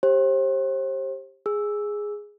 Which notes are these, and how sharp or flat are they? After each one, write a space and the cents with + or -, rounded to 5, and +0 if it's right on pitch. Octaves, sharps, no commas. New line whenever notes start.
G4 +0 C5 +35
G#4 +0 E6 +0